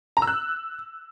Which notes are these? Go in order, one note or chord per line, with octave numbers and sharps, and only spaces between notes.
A#5
E6
F#6